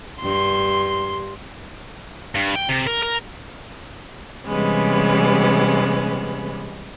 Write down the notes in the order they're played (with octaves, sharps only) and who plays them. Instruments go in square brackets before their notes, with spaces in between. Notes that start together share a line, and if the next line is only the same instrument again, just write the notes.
[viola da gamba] G2 [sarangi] C6
[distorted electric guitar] G2
G5
C3
A#4
A#4
[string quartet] C3 E3 G3 G#3 B3 C#4